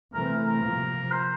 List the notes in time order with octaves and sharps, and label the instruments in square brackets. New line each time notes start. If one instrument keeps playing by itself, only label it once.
[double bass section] C3 E3 A3 C4 [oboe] A#4
[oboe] A#4
[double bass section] C3 F3 A#3
[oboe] C5